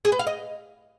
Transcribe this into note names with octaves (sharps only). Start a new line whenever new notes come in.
G#4
B4
F5
D#5